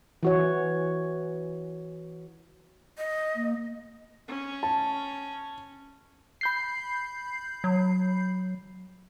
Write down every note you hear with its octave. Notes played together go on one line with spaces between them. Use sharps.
E3 F#4 C#5
D#5
A#3
C#4
A5
B5 G6 C7
F#3